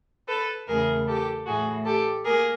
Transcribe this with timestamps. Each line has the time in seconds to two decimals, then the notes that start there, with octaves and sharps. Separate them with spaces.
0.28 A4 B4
0.68 E2 C#3 E3 A3 G#4 A#4
1.07 G4 A4
1.46 A2 E3 A3 F#4 G#4
1.86 G4 A4
2.25 A#3 G#4 A#4